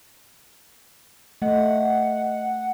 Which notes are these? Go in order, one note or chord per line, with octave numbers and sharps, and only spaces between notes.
A3 D#5 F#5